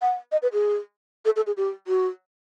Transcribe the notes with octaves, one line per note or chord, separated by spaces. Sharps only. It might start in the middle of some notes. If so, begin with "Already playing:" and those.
F#5
D#5
B4
G#4
A4
A4
G#4
G4
F#4